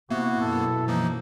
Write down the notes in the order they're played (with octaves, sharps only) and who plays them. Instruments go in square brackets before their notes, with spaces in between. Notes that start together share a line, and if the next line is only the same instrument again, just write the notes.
[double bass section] C3 [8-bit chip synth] A#3 B3 [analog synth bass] E4 [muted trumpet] F#4
[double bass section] F#2 B2 [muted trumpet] A4
[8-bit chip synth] E3 F3 A#3 [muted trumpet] D#4